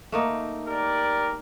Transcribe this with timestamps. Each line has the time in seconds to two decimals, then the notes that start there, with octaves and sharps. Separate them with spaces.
0.12 A3 A#3 D#4
0.68 G4 A#4 D5